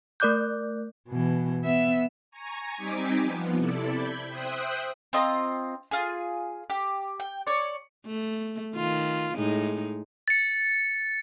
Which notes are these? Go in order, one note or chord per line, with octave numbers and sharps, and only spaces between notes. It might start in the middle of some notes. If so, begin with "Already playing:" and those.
A3 A#4 D5 D6 F#6 G6
B2 E3
B3 E5
G#5 A#5 C#6
G3 C4 D#4 G#5 D6 B6
F3 B3
C3 E4 A4 D5
B5 G6 G#6
C5 E5 G5 D#6 F#6
C4 F4 D#5 A#5
F4 G#4
G4
G5
C#5 D5
A3
D#3 F4
A2 G#3 D#4
A6 C#7